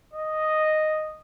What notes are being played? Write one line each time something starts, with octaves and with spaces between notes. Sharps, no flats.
D#5